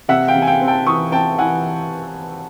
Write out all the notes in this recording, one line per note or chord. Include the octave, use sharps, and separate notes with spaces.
C3 E5 F#5
F5 G5
C3
G#5
F5 G5
C4
G5 A5
E3 C#6 D#6
C4 G5 A5
E3 F#5 G#5